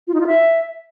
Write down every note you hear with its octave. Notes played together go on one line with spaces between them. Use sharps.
F4
D#4
F4
E5